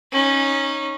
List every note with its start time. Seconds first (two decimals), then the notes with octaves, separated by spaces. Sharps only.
0.12 C#4 D#4